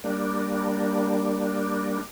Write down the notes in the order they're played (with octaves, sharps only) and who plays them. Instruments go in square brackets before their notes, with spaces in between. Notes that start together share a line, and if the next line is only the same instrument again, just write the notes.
[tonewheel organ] G3 A#3 D4